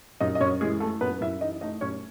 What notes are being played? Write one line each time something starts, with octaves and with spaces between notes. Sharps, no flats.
F#2 D#4 D#5
D#5
F#2 C#4 C#5
E3 G#3 G#4
A3 A4
F#2 B3 B4
F#2 E4 E5
E3 D#4 D#5
A3 D#4 D#5
F#2 C#4 C#5